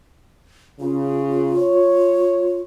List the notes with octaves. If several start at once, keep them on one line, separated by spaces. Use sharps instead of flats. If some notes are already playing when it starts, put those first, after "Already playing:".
C#3 F4
C#5